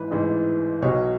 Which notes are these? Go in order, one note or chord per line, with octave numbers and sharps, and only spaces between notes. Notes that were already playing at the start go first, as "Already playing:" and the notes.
Already playing: A1 G#2 E3 G#3 B4
A1 G#2 E3 G#3
B1 B2 F#3 C#5